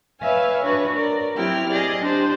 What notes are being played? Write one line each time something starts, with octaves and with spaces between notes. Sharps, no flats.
B4 C#5 E5 F5 G#5
D4 F#4 B4 C#5
A#4 D5
F#3 C4 E4 G4 G5 F6
G#4 D5 D#5
D4 G4 C5